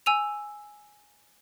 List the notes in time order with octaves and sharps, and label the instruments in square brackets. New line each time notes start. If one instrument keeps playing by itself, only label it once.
[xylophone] G#5 E6 D#7 F7